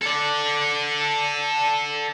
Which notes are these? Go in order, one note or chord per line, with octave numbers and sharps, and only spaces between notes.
A4 D5